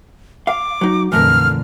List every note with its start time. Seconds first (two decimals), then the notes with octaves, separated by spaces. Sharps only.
0.47 F5 D6
0.81 F#3 D#4
1.12 F2 A#2 D3 E3 A3 A#4 F6